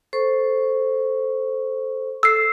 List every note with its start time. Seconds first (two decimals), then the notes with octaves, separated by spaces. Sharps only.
0.13 A4 C5 C#6
2.23 A4 E6 C7